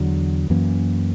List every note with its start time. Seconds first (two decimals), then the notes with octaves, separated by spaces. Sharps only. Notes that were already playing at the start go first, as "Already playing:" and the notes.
Already playing: E2 D3 F#3
0.50 F#2 E3 A#3 C#4